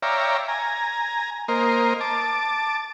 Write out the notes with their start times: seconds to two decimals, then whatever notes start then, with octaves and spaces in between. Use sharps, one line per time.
0.02 C#5 D5 E5 F5 G5 A#5
0.48 G#5 A#5
1.48 A#3 A#4 C5 D#5
2.01 A5 D6